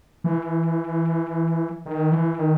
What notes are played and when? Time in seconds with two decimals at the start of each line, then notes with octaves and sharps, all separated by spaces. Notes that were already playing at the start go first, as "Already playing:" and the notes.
0.24 E3
1.86 D#3
2.12 E3
2.39 D#3